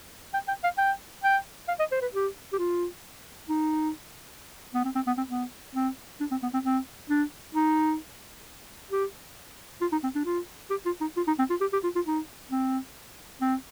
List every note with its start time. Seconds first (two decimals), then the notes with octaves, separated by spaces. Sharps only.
0.34 G5
0.48 G5
0.64 F5
0.78 G5
1.24 G5
1.68 F5
1.79 D#5
1.92 C5
2.02 B4
2.14 G4
2.53 G4
2.58 F4
3.49 D#4
4.75 B3
4.85 C4
4.95 C4
5.07 B3
5.18 C4
5.30 B3
5.75 C4
6.21 D4
6.31 C4
6.43 B3
6.54 C4
6.65 C4
7.10 D4
7.55 D#4
8.91 G4
9.82 F4
9.92 D#4
10.04 C4
10.15 D4
10.26 F4
10.71 G4
10.86 F4
11.01 D#4
11.17 F4
11.28 D#4
11.39 C4
11.50 F4
11.61 G4
11.73 G4
11.84 F4
11.96 F4
12.06 D#4
12.51 C4
13.41 C4